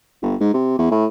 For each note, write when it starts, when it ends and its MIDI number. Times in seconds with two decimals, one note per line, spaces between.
0.22 0.35 31
0.41 0.50 44
0.54 0.75 48
0.79 0.91 40
0.91 1.06 45